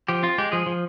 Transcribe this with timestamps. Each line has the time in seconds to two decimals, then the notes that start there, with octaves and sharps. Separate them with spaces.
0.08 F3 G4
0.23 C4 F4
0.38 G#3 G4
0.52 F3 G#4
0.66 F3